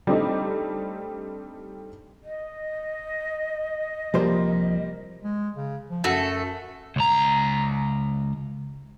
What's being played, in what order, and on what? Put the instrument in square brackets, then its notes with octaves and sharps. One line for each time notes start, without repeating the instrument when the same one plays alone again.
[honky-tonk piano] G3 A3 C4 D4 D#4
[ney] D#5
[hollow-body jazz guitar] C2 F3 C5 [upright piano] G3 A#3
[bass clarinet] G#3
C#3
F3
[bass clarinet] F#2 [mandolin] A3 F#4 A4
[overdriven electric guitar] C#2 A#5